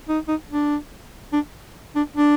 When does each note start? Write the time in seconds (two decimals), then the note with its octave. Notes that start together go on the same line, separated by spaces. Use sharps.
0.08 D#4
0.28 D#4
0.51 D4
1.33 D4
1.96 D4
2.16 D4